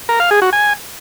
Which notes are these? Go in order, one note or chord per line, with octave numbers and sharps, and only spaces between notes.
A#4
F5
G#4
F#4
G#5